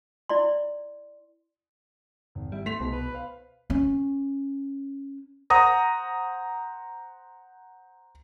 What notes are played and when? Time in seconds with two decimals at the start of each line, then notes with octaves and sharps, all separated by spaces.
0.29 E4 D5 C6
2.35 G#1
2.52 G3 E4
2.66 A3 C6 B6 F7
2.80 C2 G#2 B2
2.92 B4
3.12 C5 F5
3.70 C#4
5.50 C5 F#5 A#5 D#6 A#6